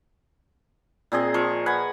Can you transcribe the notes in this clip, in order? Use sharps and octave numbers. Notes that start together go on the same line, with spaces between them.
A#2 C4 G#4 D#5
F3 C#6
B4 F#5 G#5